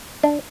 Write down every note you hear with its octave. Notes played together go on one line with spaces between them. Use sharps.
D4